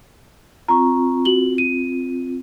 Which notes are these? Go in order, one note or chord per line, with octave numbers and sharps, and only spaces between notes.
C4 F4 A#5 C#6
F#4 F#7 G7
D#7